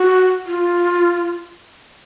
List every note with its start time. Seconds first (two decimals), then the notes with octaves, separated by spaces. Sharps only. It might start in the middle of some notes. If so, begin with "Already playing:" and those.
Already playing: F#4
0.46 F4